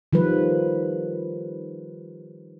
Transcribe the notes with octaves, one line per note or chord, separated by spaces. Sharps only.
D#3 F3 G3 B4